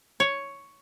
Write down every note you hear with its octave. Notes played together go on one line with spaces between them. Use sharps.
C#5